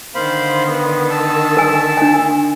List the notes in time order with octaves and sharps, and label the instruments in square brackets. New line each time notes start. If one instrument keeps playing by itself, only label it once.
[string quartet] D3 D#3 [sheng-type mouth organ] C5 F5 B5
[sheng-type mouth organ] B3
A5 E6
[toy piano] A#4 G#5
D4 G#5